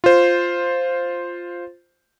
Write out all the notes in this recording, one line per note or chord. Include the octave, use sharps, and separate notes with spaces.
F4 C5